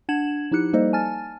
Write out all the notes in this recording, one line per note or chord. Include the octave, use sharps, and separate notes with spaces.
D4 F#5 G#6 E7 F#7
F3 D#4 E4 G4 F#6 C#7
G3 A#3 D#4 A4 C5 D#5
G#5 A5 F6 A6